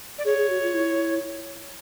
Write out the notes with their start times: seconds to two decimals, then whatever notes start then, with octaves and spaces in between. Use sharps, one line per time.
0.18 D5
0.25 G#4 C#5
0.37 G#4
0.49 F#4
0.62 F4
0.74 E4